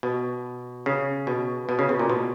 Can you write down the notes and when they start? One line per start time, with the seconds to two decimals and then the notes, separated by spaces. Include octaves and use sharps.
0.03 B2
0.86 C#3
1.27 B2
1.69 B2
1.79 C#3
1.89 B2
1.99 A#2
2.10 B2